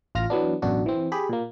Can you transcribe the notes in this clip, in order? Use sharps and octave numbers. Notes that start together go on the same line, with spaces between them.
A1 F4 F6 A#6
E3 F#3 B3 D4
A1 F#2 B2 D4 F#4
E3 C4
G4 G#4 B5
A#2 A#3